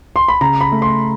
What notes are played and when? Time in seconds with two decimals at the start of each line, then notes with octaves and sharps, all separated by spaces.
0.16 C6
0.28 B5
0.41 C#3 A#5
0.61 B5
0.72 A3
0.82 C6